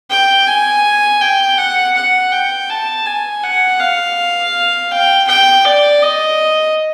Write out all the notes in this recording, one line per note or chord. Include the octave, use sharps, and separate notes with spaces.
G5
G#5
G5
F#5
F#5
G5
A5
G#5
F#5
F5
G5
G5
D5
D#5